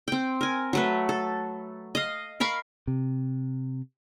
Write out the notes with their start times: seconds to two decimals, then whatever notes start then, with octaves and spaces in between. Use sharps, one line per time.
0.08 C4 G5
0.41 A#4 G#5
0.73 F#3 A3 B4
1.09 A4
1.95 D#5 F5
2.40 A#4 F5 B5 C#6
2.87 C3